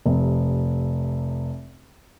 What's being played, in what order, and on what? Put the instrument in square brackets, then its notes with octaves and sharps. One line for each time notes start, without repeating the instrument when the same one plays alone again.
[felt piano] F1 C3